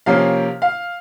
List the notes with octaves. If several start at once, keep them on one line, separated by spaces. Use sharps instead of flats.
C3 F3 A#3 C#4 F5
F5